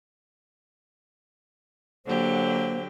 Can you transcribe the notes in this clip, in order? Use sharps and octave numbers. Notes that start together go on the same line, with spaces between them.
D3 F#3 A#3 G4 C5